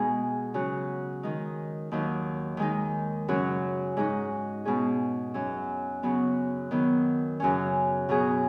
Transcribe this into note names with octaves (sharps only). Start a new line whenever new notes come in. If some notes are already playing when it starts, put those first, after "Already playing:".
Already playing: B2 G#3 D#4 G#4
C#3 F#3 C#4 F#4
D#3 G#3 D#4
D#2 D#3 F#3
D#3 G#3 D#4
F#2 C#3 F#3 C#4 F#4
G#2 G#3 D#4 F#4
B2 G#3 C#4 G#4
F#2 F#3 C#4
C#3 F#3 B3 F#4
D#3 F#3 B3
F#2 C#3 F#3 C#4
B2 F#3 B3 G#4